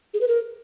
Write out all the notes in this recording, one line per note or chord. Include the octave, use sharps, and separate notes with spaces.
G#4
B4
A#4